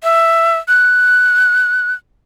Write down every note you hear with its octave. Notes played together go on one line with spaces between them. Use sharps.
E5
F#6